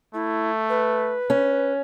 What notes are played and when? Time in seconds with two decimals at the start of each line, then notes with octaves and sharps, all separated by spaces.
0.14 A3 E4
0.69 B4
1.30 C#4